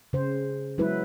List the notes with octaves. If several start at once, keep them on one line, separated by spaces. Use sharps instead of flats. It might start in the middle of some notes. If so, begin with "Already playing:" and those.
C#3 C5
F#3 G#3 E4 B4